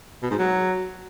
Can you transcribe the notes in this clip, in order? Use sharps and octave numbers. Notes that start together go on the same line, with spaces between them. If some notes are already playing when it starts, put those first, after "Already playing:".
B2
G#2
F#3